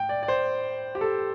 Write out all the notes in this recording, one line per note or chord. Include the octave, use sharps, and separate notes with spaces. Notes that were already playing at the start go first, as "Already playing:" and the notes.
Already playing: A2 G5
D5
D5
C5
G4
A4